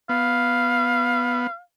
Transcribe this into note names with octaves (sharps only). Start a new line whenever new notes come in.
B3 F5